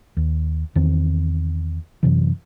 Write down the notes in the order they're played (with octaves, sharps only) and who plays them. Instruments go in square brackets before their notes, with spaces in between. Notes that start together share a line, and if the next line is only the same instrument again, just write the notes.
[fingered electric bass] D#2
E2 D#3 C4
F#2 C3 E3